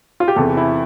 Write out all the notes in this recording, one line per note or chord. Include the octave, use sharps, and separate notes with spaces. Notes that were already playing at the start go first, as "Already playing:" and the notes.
F4
G4
E2 C3 E3 A4
E4